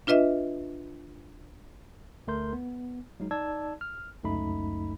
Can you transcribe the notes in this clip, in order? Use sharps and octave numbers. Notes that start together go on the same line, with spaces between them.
D4 F4 B4 D#5 E5
D2 A3 A#4 C6 G6
B3
F#3 G#3 D#4
D#4 D5 A5 E6 G#6
F6
G1 C#2 F#2 A3 D#4 B5